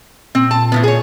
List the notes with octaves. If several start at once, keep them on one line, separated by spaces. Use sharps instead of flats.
A#2 C4
A5
A2 F#3 B3
G#4 C#5